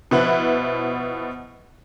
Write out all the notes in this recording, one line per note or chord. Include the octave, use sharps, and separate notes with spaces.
B2 F3 E4 B4 F#5 F#6